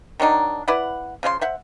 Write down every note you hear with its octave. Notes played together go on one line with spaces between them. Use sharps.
D#3 F#3 D4 D#4
E4 B4 D5 F#5
C#3 F3 D4 C6
C5 E5 F#5